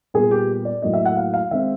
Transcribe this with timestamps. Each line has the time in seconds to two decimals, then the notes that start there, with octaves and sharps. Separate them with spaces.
0.14 A#2 G3 B3 G#4
0.31 G4
0.65 D5
0.82 A2 F#3 A#3 D#5
0.94 E5
1.05 F#5
1.17 F5
1.34 F5
1.51 D#3 G#3 C4 E5